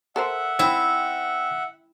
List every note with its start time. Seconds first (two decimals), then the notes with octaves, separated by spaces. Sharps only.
0.16 A4 A#4 C5 E5 F#5
0.59 C4 E4